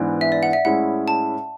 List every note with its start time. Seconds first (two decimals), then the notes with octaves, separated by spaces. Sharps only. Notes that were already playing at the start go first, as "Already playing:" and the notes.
Already playing: G#2 E3 B3 D4
0.21 E5
0.32 D5
0.43 F#5
0.53 E5
0.65 A2 G#3 C#4 E4 F#5
1.08 A5